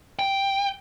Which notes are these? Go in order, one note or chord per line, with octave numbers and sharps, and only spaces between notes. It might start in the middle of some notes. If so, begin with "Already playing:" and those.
G5